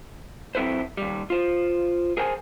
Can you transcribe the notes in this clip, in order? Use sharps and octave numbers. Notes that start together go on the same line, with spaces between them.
F#3 C4 E4 A4 B4 C5
D#2 G3
F4 C5
G#4 A#4 C5 G5 G#5